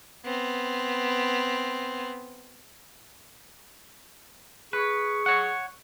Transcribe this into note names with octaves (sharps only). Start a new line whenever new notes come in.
B3 C4
G#4 B4 C#6
C#5 F#5